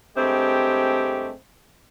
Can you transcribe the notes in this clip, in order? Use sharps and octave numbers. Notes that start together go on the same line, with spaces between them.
G2 G#3 A3 C4 G4